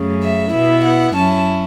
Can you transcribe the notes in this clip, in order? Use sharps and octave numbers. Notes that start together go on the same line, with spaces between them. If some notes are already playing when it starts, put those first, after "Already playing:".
Already playing: F#2 C#3 A3
E5
B2 B3 E4 E5
F#5
F#2 F#3 C#4 E4 A5